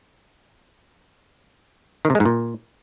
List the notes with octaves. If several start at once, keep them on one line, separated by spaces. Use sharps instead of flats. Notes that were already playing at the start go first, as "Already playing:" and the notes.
D#3
C3
G#3
G#2
A#2